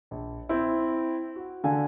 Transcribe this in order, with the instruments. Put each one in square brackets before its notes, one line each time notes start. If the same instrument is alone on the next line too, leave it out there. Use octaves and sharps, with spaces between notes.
[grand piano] A#1
C4 E4
F#4
[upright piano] D3 F5 G#5